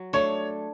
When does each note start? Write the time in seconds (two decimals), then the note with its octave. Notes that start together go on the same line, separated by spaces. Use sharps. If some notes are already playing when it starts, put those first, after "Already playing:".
Already playing: F#3
0.13 A3 D4 C#5